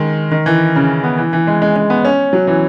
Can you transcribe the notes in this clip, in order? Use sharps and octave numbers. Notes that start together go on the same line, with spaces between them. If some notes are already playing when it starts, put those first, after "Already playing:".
Already playing: D#3 G#3
D#3
E3
C#3
B3
E3
E3
G#3
G#3
G#3
B3
C#4
F#3
E3